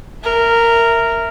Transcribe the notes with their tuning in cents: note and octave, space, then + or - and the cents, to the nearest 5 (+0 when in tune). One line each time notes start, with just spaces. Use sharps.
A#4 -10 E5 +0